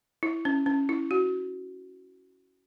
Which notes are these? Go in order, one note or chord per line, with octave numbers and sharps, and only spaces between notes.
E4
C#4
C#4
E4
F#4